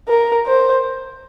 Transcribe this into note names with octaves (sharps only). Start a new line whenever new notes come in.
A#4
C5